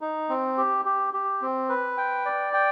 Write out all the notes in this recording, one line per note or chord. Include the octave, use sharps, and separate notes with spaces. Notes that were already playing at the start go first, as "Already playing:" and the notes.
D#4
C4
G4
G4
G4
C4
B4
G5
D5
G5